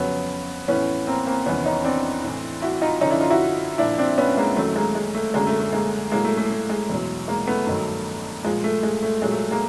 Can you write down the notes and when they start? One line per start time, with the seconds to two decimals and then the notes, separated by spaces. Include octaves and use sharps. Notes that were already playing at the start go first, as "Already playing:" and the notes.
Already playing: F2 C#3 F#3 B3 C#4
0.68 A2 E3 B3 C#4
1.07 A#3 C4
1.27 A#3 C4
1.46 E2 C3 D#3 B3 C#4
1.65 C#4 D#4
1.85 C4 D4
2.23 A2 E3
2.62 E4 F#4
2.82 D#4 F4
3.01 F#2 D3 F3 C#4 D#4
3.11 D4 E4
3.20 D#4 F4
3.30 E4 F#4
3.78 A#2 F3 D4 E4
3.98 C4 D4
4.18 B3 C#4
4.37 G#3 A#3
4.57 F#2 D#3 F#3 A3
4.76 G#3 A#3
4.95 G#3
5.15 A3
5.34 F#2 D3 F#3 G#3 A#3
5.47 A3
5.60 A3
5.73 G#3 A#3
6.12 A2 F#3 G#3 A#3
6.25 A3
6.37 A3
6.50 A3
6.70 G#3
6.90 E2 B2 F#3
7.28 G#3 A#3
7.47 A3 B3
7.67 G2 D#3 F#3 A3
8.44 A#2 F3 G#3
8.64 A3
8.83 G#3
9.02 A3
9.22 A#2 F#3 G#3
9.32 A3
9.51 G#3 A#3